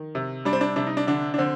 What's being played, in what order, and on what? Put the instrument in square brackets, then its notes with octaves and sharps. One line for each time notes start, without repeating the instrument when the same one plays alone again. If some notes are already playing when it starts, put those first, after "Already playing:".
Already playing: [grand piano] D#3
C3
G3 D4
C4
D4
C3 D4
D#4
D4
D3 D4
D4
D3 C4